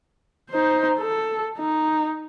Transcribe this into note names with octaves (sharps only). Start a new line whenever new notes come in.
D#4 C5
A4
D#4